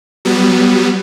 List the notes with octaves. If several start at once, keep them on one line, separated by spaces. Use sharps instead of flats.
F#3 G3 B3